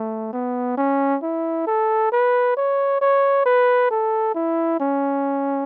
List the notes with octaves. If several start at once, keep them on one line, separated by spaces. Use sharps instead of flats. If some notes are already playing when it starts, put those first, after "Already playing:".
Already playing: A3
B3
C#4
E4
A4
B4
C#5
C#5
B4
A4
E4
C#4